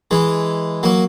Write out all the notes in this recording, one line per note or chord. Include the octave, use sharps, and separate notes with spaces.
E3 G#3
F#3 A#3